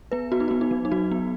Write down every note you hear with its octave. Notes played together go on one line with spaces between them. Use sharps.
B3 B4
B3 F#4
D#4
B3 F#4
D#4
F#3
D#4
F#3 F#4
B3